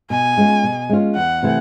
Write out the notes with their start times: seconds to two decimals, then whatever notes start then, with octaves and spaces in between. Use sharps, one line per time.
0.10 B2 G#5
0.37 G#3 C#4 F4
0.63 B2
0.89 G#3 C#4 F4
1.16 E2 F#5
1.43 C3 E3 A3